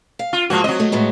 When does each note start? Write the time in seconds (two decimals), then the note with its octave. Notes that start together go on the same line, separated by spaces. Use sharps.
0.19 F5
0.33 F4
0.50 G#2 F3 A#3 F#4
0.64 F#3 C4 D#5
0.80 A3
0.92 A2 G#3 B3